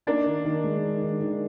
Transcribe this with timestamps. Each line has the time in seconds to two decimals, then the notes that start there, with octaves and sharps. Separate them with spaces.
0.07 A#3 D4 D#4
0.26 D#3
0.45 D#3
0.64 G#3
0.83 D#4
1.02 D#3
1.20 D#3